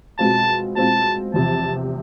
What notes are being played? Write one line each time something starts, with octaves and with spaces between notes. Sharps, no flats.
B2 G#3 C4 F4 A5
B2 G#3 C4 F4 A5
E2 C3 F3 A5